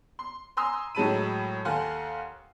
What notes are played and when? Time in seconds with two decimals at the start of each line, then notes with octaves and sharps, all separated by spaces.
0.19 C6
0.57 G#5 A#5 C6 D#6 E6
0.95 A2 F#3 G#3 A5 B5 D#7
1.65 D#2 A4 F5 F#5 G#5 C6